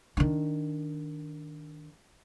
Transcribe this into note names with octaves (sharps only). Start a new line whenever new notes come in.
D#3 D4